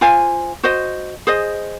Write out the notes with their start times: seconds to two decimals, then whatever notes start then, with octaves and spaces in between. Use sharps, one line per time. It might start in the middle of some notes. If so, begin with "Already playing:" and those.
0.01 F4 C5 F5 G#5
0.63 F#4 C5 D#5
1.27 G#4 C5 D#5